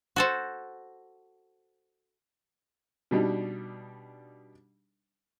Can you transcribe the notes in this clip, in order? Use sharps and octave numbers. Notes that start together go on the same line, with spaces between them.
F#4 A4 C5
B2 G3 D4 D#4